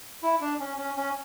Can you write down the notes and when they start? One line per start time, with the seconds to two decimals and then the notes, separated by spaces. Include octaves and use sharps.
0.23 E4
0.41 D4
0.60 C#4
0.78 C#4
0.97 C#4